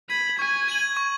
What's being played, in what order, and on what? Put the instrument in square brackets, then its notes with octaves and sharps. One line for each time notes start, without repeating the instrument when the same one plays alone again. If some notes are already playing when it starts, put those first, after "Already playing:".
[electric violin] B5 [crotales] G#6 D#7 F#7
[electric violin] G#5 [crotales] C#6
[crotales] G#6 D#7 F#7
C#6